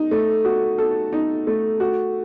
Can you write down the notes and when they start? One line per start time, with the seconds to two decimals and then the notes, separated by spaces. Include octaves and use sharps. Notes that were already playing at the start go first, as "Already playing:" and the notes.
Already playing: D#4
0.11 A3
0.45 F#4
0.78 A4
1.13 D#4
1.47 A3
1.80 F#4